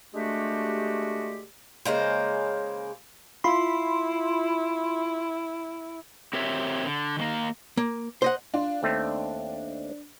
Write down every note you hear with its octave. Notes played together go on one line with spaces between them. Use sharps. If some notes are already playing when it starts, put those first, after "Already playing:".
D3 G#3 A3 D4 F#4 G4
C#3 G#3 A#3 C5
E4 F4 B5 C6
C4 G4 A#4 C#5 E5
D3
D#3 G#3 A#3
A#3
C5 D#5 F#5
D4 F4
D#2 A3 C4